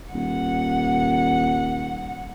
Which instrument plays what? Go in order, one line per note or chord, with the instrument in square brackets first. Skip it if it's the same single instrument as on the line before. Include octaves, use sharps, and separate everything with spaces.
[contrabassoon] D#1 [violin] F#5